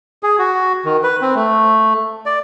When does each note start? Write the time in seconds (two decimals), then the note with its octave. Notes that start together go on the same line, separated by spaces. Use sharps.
0.23 G#4
0.39 F#4
0.85 D#3
1.03 B4
1.22 C4
1.35 A3
2.26 D5